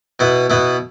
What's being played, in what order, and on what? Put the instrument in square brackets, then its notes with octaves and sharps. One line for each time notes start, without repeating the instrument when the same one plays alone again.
[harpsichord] B2 B3 E4
B2 B3 E4